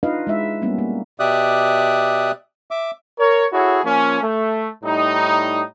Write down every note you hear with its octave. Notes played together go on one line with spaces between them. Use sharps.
D4 D#4 F4 B4 D#5 F5
G#3 E4 E5
G3 A#3 B3 C#4
A#3
B2 G4 D5 E5 D#6 F#6
E5 D6
A#4 C#5
E4 F#4 G#4 A4 C#5
F3 A#3 C#4
A3
A2 G3 D#4